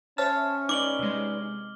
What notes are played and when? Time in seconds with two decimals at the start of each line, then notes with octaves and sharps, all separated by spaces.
0.18 C#4 C5 C#5 E5 A5 F6
0.69 D#4 B4 D5 D6 F#7 G7
0.99 C3 G#3